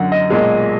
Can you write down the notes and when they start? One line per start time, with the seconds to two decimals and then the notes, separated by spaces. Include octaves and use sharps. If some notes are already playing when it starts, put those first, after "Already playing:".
Already playing: F#2 D3 F#3 F#5
0.12 D#5
0.30 B1 A#2 G#3